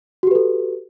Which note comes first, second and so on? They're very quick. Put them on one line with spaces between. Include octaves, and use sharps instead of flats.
F#4 G4 B4 A4